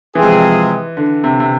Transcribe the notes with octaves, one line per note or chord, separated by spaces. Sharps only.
C3 E3 F3 G#3 C4 G#4
D3
C3
C3